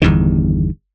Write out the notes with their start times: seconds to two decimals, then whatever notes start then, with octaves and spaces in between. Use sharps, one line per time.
0.02 G1 E2 G2 D#3